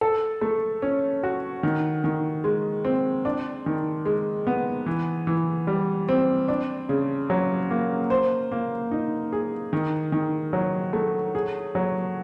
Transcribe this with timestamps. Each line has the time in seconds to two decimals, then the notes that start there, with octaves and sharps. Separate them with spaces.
0.01 A4
0.41 A3
0.82 C#4
1.23 F#4
1.63 D#3
2.04 D#3
2.44 G#3
2.85 C4
3.25 D4
3.66 D#3
4.05 G#3
4.47 B3
4.86 E3
5.27 E3
5.67 G3
6.09 C4
6.48 D4
6.89 C#3
7.30 F#3
7.71 A#3
8.10 C5
8.52 A#3
8.91 D#4
9.33 G#4
9.73 D#3
10.12 D#3
10.53 F#3
10.93 A3
11.35 G#4
11.75 F#3